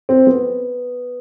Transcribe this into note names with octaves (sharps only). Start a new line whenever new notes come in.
C4
B3